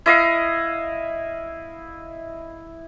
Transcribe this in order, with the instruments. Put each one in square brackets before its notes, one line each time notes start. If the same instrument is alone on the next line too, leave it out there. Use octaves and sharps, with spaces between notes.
[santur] E4 D#5 F5